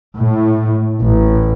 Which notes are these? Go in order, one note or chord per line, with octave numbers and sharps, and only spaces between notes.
A2
A1